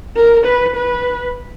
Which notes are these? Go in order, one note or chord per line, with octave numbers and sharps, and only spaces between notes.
A#4
B4
B4